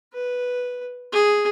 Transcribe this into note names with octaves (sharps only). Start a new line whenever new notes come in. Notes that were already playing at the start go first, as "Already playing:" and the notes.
B4
G#4